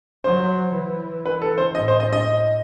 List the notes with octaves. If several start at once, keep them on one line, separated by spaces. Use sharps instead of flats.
F#3 C5
E3
B4
A4
C5
A2 D#5
C5
D#5
D#5